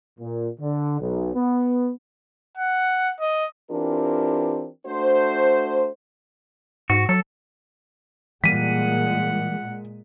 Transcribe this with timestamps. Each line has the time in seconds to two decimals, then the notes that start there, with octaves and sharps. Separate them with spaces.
0.20 A#2
0.60 D3
1.01 B1
1.35 B3
2.57 F#5
3.21 D#5
3.71 E3 C4 D4 F4 G4 A#4
4.87 A3 D4 F#4 C5
6.90 G#2 F#4
7.09 F#3 A4
8.44 A#2 E3 G3 G#3 A#3 F#5 B6 D#7